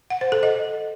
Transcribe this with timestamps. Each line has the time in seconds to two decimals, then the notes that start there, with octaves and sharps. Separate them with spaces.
0.10 F#5
0.21 C5
0.32 A4
0.43 D#5